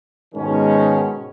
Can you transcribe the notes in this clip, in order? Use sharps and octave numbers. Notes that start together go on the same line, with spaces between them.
G#2 B2 D#3 G#3 C#4